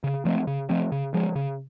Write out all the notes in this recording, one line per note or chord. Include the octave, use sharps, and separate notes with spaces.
C#3
F3 A3 C4
C#3
F3 A3 C4
C#3
F3 G#3
C#3